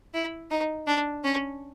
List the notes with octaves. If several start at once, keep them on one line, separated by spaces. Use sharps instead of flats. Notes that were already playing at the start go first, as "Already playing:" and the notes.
E4
D#4
D4
C#4